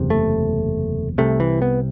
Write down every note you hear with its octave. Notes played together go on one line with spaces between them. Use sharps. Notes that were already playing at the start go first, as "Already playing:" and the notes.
Already playing: F#1 E2 C3
A3
C2 C3 A3
E3
B3